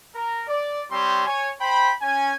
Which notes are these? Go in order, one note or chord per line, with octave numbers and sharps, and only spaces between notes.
A#4 A#5
D5
G3 C4 C#5 C6
C#5 G#5
C5 G5 B5
C#4 G#5